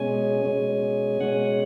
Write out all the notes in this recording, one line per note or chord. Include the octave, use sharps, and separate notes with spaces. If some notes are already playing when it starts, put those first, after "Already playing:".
Already playing: B2 G#3 C#4 G#5
B2 G#3 C#4
B2 G#3 C#4 F#5